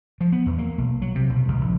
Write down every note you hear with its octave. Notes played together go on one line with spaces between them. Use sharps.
F3
B3
E2
A#3
B1
F#3
C3
B1
C#2
A#1